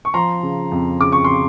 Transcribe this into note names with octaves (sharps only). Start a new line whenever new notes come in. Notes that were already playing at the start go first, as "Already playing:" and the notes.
C#6
F3 A#5 C6
C#3
F2
C#3 D6
C#6
C#3 C6